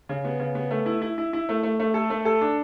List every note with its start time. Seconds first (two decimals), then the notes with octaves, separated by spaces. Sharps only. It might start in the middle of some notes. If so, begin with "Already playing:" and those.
0.09 C#3
0.25 B3
0.40 C#3
0.55 B3
0.71 A3
0.86 E4
1.02 E4
1.18 E4
1.33 E4
1.49 A3
1.63 A3
1.80 A3
1.94 A4
2.10 A3
2.25 A4
2.41 D4